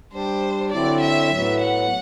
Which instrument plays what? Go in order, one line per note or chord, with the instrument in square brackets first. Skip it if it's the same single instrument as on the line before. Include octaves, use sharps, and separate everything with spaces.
[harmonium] G3 D4 G4 [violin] C5
[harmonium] D3 F#3 C4 E4 [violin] D5
[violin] E5
[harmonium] A2 F#3 B3
[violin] F#5